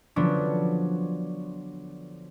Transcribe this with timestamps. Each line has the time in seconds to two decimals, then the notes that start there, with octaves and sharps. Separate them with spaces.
0.16 D3 F3 F#3 B3 D4